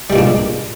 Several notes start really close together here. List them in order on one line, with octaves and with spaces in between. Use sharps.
G3 G#3 A#2 D4